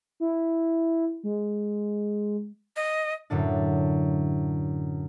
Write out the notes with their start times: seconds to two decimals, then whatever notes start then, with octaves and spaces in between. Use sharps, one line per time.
0.20 E4
1.24 G#3
2.76 D#5
3.30 F#2 A2 D3 D4